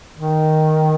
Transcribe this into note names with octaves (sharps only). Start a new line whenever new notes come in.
D#3